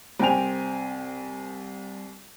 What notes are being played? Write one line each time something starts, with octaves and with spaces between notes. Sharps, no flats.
C2 C4 G5 G#5 F7